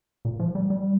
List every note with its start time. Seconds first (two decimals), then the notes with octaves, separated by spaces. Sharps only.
0.25 A#2
0.40 F3
0.55 G3
0.70 G3